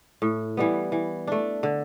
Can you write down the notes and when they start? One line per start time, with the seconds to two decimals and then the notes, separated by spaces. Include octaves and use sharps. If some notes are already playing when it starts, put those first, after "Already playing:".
0.22 A2
0.57 E3 G3 B3
0.92 E3
1.27 A3 D4
1.63 D3